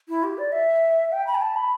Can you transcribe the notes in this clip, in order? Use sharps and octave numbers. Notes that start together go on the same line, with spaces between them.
E4
G4
D5
E5
G5
B5
G5
A5
B5